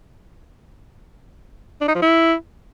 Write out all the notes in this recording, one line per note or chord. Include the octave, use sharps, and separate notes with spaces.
D4
D#4
F3
E4